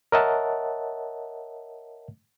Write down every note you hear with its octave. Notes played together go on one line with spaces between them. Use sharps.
A#4 C#5 D#5 E5 F#5 A5